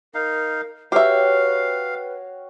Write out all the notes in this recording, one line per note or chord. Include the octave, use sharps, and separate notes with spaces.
D#4 A#4 F5
F#4 G4 B4 C#5 E5 F5 G5